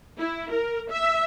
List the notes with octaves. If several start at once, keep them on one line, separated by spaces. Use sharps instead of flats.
E4
A#4
E5